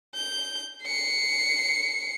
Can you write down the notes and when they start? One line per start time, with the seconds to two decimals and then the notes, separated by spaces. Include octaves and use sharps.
0.15 G6
0.84 C7 C#7